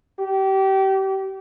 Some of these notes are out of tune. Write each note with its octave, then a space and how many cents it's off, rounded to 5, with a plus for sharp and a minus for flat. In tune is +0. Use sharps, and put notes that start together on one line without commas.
G4 -30